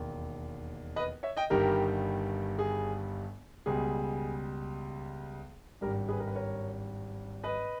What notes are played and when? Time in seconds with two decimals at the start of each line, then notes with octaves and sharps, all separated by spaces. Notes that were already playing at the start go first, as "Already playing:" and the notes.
Already playing: E1 D#2 D#3
0.96 B4 D#5
1.23 C#5 E5
1.37 D#5 G5
1.50 G1 G2 D#3 G3 G4 A#4
2.59 G#4
3.66 C#2 B2 G3 G#4
5.81 G#1 G2 G3 G4 A#4
6.09 G#4 B4
6.20 A#4
6.27 B4
6.35 A#4 C#5
7.44 B4 D#5